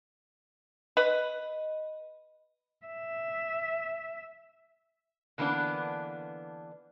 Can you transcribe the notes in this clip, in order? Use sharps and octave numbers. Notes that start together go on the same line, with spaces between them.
B4 D#5
E5
D3 E3 A#3 B3 D4